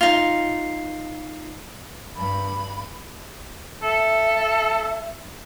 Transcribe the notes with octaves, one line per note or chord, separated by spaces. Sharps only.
D#4 F4
G2 B5
A4 E5